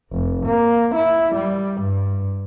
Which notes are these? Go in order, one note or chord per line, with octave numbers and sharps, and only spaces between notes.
F1
A#3
E4
G3
G2